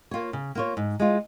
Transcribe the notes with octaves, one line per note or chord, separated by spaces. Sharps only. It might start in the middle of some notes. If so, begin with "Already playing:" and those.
A#3 F4 C#5
C#3
A#3 F4 C#5
G#2
G#3 F4